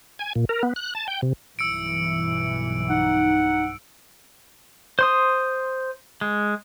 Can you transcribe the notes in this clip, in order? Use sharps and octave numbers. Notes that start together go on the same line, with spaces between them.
G#5
A#2
A#4
B3
F#6
A5
G5
C3
B1 G2 E3 E6 C#7 D7
D#4 F#5
C5 C6 D#6
G#3